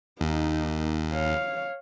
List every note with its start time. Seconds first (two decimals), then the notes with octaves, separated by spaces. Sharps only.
0.21 D#2 A#3 D#4
1.13 C#5 F5